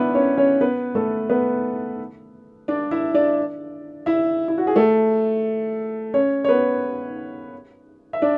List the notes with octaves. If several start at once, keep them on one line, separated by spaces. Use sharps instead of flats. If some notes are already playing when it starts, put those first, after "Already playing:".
Already playing: B3 D4 E4 B4 E5
C#4 C#5
C#4 C#5
B3 B4
A3 A4
B3 B4
D4 D5
E4 E5
D4 D5
E4 E5
E4
F#4
G#4
A3 A4
C#4 C#5
C#5
B3 B4
E5
D4 D5